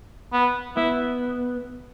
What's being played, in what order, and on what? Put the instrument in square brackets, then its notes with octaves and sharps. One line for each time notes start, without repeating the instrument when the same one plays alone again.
[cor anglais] B3
[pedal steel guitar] B3 [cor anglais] E4